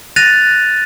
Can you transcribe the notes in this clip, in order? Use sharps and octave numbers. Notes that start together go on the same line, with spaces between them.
F#6 A6 A#6 D#7 F7